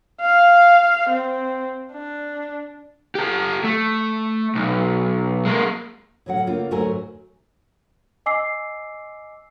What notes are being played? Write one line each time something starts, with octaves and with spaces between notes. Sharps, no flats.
F5
C4
D4
G4 A4
A3
B1
G#3 A#3
A2 D3 F#3 C#4 F#5
C#3 A3 A#3 F4
D2 G#2 F#3 A3 A#4 G#5
D#5 G#5 D6 E6 C7